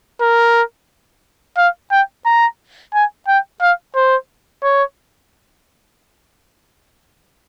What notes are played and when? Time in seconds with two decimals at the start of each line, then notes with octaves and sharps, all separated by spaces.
0.21 A#4
1.57 F5
1.91 G5
2.26 A#5
2.94 G#5
3.28 G5
3.61 F5
3.95 C5
4.63 C#5